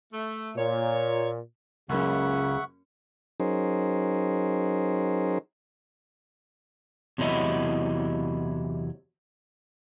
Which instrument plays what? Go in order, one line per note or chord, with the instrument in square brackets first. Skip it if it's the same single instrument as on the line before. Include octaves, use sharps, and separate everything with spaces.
[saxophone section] A3
[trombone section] A#2 [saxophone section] C#5
[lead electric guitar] C#2 [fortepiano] F#2 A#3 C#4 [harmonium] C#3 [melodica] E5 F#5 C#6
[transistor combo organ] F#3 C#4 D#4 G#4 A#4 C5
[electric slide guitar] E2 C3 F#3 E4 D#5